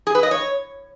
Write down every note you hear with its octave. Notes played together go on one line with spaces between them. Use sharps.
G#4
B4
D#5
C#5